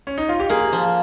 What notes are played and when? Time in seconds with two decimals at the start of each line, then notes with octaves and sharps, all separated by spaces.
0.07 C#4
0.18 D#4
0.29 F4
0.40 G4
0.50 A#3 G#4
0.73 F3